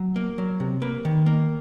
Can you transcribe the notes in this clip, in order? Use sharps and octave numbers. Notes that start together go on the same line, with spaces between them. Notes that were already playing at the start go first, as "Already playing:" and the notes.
Already playing: F#3
A#3
F#3
C3
A#3 B4
D#3
A#3